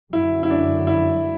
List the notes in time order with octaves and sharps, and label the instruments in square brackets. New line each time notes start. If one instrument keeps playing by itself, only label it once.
[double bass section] F#2 D3 F#3 [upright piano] E4
[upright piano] E4
D4
E4